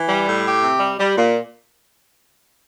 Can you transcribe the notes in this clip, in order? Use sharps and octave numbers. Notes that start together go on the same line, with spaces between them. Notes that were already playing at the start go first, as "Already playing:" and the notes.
Already playing: E3
G3
A2
G4
C3
G3
G3
A#2